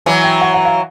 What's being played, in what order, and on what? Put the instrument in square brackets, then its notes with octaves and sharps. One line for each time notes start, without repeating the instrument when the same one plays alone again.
[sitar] E3 F#3 [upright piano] G#5
[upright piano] G5
F#5
F#5
F5